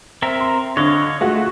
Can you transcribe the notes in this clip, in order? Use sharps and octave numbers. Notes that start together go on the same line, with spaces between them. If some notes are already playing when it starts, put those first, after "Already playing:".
C4 A#4 E5
C6
D3 C#5 D#5 F5
G#3 A3 F4 F#4